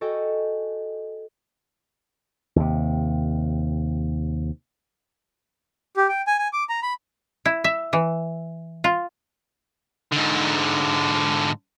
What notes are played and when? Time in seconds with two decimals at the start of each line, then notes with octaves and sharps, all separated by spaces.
0.01 F#4 A4 D#5 G5 G#5
2.56 D#2 C3
5.97 G4
6.09 G5
6.27 G#5
6.39 G#5
6.53 D6
6.69 A#5
6.83 B5
7.45 E4
7.64 E5
7.93 E3
8.84 F4
10.12 G#2 D3